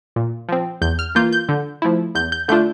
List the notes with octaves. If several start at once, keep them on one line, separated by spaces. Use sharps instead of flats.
A#2
F3 C4
E2 G6
F6
E3 A#3 F4 G6
G6
D3
F3 A3 E4
E2 G6
G6
D3 A3 D4 F4 G6